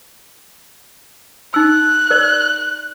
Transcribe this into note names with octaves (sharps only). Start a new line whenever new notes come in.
D#4 E6 F#6
A#4 D5